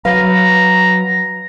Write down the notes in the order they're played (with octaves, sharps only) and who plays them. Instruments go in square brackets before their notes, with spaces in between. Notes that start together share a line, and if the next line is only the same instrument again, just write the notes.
[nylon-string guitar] F#3 B4 F5 [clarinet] A#5